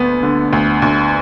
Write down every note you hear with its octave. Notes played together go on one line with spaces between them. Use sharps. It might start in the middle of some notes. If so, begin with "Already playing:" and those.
Already playing: D2 B3
D3
D2
D2